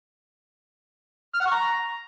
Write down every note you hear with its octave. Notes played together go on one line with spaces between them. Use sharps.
F6
F#5
C#6
A#5